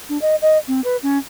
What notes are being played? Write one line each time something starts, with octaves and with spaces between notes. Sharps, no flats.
D4
D#5
D#5
C4
B4
C#4